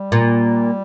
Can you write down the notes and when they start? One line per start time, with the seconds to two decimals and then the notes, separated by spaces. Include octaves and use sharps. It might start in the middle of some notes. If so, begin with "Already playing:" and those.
Already playing: G3
0.12 A#2